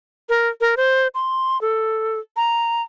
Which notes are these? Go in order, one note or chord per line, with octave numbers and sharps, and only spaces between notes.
A#4
A#4
C5
C6
A4
A#5